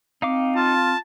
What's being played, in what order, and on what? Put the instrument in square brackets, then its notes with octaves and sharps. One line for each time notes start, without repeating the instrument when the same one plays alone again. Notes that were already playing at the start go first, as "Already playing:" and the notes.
[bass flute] C4 [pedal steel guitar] D#4 F5 D6
[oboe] F4 [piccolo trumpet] A5